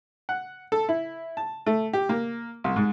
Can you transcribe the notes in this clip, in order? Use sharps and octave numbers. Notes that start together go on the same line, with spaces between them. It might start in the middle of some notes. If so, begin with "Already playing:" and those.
F#5
A4
E4
A5
A3
G4
A#3
C2
G#2